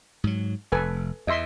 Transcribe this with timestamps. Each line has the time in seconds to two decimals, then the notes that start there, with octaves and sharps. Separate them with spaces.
0.24 G#2 F#3
0.72 F1 A4 B4 G#5
1.27 E2 D#5 E5 C6